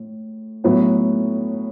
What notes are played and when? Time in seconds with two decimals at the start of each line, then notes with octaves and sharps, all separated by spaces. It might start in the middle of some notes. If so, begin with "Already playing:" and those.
Already playing: A2
0.64 A2 F#3 B3 F#4